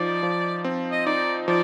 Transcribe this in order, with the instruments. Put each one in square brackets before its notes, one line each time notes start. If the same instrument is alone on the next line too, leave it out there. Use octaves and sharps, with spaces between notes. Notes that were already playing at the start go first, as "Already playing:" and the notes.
Already playing: [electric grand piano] F3 D#4 [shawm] D5
[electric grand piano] F3
C4
[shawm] D#5
[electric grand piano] D#4 [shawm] D5
[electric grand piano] F3 [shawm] D5